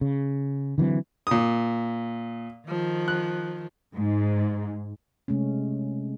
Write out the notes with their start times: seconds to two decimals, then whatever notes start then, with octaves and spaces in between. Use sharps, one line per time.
0.01 C#3
0.78 D3 E3 F#3 C4
1.27 A#2 D#6
2.65 D#3 F3
3.08 F#6
3.95 G#2
5.28 C3 G#3 A3 C#4